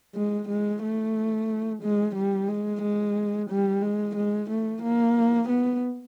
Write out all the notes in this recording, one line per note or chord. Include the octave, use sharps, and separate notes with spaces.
G#3
G#3
A3
G#3
G3
G#3
G#3
G3
G#3
G#3
A3
A#3
B3